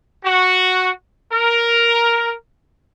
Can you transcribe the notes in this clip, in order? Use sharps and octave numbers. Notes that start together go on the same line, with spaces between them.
F#4
A#4